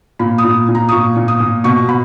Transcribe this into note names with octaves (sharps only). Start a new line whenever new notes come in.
A#2 B5
D#6
A#2
A#2
A#5
D#6
A#2 C#6
A#2
D#6
A#2
B2 C#6
B2 B5